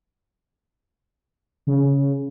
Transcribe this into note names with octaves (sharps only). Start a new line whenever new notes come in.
C#3